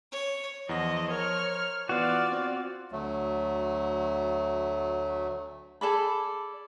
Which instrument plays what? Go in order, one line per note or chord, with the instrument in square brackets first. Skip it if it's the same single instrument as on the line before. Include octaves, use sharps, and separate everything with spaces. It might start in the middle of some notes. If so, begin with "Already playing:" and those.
[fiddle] C#5
[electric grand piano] E2 F#5 A#6 [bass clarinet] F3 [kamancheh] D#5
[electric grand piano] A#4 [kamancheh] C#5 F6
[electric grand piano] E3 B3 [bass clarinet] F4 [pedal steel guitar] F#4 F5 [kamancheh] D5
[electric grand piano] C4
[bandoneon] D2 F#3 A3
[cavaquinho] G#4 A4 D5 B5